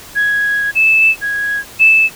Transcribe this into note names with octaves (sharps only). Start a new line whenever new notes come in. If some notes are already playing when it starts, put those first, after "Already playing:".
G#6
E7
G#6
E7